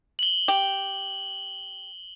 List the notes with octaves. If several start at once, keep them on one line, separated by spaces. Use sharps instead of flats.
F#7 G7
G4